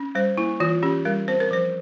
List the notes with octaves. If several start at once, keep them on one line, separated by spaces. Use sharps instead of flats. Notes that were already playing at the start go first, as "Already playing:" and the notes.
Already playing: C#4
G3 C5
A#3 E4
E3 F4
C#4 G4
G3 A#4
C4 C5
A#4
F3 C5